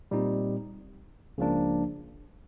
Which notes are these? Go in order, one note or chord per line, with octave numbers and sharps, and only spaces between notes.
A#2 G3 C4 D#4
C#2 C#3 F3 A#3 D4